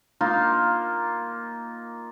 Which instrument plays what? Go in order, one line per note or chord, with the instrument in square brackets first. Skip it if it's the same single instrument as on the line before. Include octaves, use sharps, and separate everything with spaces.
[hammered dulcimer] A#3 D#4 F4